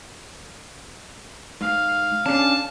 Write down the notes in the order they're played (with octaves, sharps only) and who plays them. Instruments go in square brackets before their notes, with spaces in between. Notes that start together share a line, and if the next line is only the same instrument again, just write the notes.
[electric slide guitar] G#2 [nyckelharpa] F5
[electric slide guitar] C#4 D4 G#4 [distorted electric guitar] A5